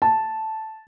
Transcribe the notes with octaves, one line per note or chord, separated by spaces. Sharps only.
A5